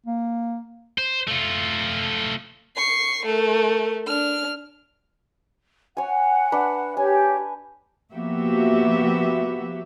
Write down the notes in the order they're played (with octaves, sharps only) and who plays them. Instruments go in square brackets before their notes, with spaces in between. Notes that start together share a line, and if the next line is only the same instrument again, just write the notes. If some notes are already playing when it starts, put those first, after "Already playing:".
[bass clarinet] A#3
[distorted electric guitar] C5
A3 F4
[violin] C#6 C7
A3 A#4
D4 F6
[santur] C#5 G#5 [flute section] F#5
[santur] D4 B4
[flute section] G4 C#5 [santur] G#5
[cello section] F3 A#3 B3 F#4 G4 E5